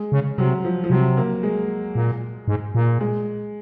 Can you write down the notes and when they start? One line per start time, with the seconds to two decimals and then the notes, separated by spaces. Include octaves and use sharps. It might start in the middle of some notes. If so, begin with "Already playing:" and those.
Already playing: G#3
0.12 C#3
0.38 C3 F#3
0.64 F3
0.84 F3
0.90 C3 F#3
1.17 A#3
1.43 G#3
1.95 A#2
2.48 G#2
2.75 A#2
3.00 G#3